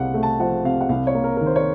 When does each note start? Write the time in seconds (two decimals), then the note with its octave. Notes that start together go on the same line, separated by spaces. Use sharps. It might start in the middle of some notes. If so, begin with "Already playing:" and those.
Already playing: C2 C3 F5 F#5
0.14 A3
0.23 A5
0.40 F3 F#5
0.64 C3 F5
0.81 F#5
0.89 C2 F5
1.07 C#5
1.15 A#3
1.24 A#4
1.37 D#3 A#4
1.46 C5
1.56 C#5